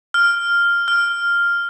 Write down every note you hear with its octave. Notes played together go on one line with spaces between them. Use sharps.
F6
F6